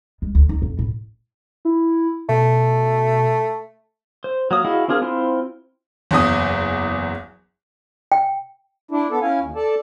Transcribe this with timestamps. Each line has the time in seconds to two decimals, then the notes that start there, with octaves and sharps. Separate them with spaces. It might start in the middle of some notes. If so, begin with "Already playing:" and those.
0.22 G#3
0.35 D2
0.49 D#4
0.62 F2
0.79 A2
1.65 E4
2.29 B2 A3
4.24 C5
4.51 F#3 A#3 D#6
4.65 E4 F#4 G#4 D#5 F5
4.88 C4 D4 F4 G#4 A#4
5.02 C4 E4 F4 C5
6.11 F#1 E2 D#6
8.12 G5
8.91 D4 E4
9.11 B3 A4
9.22 C#4 E4 F5 G#5
9.40 D#2
9.55 A4 D5 A5